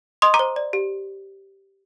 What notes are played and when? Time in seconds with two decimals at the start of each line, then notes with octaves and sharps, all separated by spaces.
0.22 D#5 C6 D#6
0.34 A#5 D6
0.39 C5
0.56 D5
0.73 G4